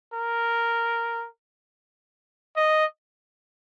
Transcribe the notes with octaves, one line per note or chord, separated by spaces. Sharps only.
A#4
D#5